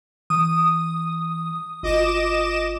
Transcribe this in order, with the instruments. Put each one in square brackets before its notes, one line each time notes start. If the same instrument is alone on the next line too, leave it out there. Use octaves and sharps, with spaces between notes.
[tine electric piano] E3 [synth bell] D#6
[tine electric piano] G1 F4 [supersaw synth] D#5 D6 E7